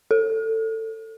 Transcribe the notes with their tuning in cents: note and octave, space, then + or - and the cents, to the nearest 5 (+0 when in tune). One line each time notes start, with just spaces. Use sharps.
A4 +20